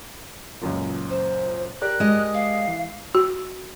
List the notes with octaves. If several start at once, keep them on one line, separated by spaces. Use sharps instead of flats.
C#2 F#2 A#2
C5
G4 A#4 D5 F#6
G#3 D#5
F5
E3
F#4